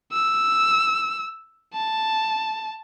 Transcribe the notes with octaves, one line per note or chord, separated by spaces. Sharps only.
E6
A5